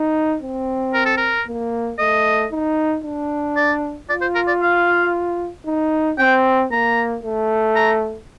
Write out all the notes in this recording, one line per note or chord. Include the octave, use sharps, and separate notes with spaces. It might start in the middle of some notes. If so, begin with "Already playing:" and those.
Already playing: D#4
C4
A#4
A4
A#4
A#3
A3 D#5
D#4
D4
D5
F4 D5
C5
A#4
D5
F5
D#4
C4 G5
A#3 A#5
A3
A#5